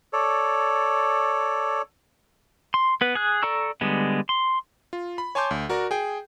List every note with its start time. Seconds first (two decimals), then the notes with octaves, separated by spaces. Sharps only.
0.13 A4 C#5 D5
2.74 C6
3.01 B3 B4
3.15 G#4 F#6
3.43 A4 D5 A#5 C#6 E6
3.81 D3 G3 G#3 B3
4.29 C6
4.93 F4
5.18 B5
5.35 C#5 G#5 A5 C6 D6 G6
5.51 D2
5.69 F#4 A#4 D5
5.91 G#4 G5